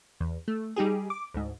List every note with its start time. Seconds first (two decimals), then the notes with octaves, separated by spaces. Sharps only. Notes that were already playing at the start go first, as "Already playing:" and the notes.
0.20 E2
0.48 A3
0.76 G3 D#4 G4 G#4
1.10 D6
1.34 D2 G#2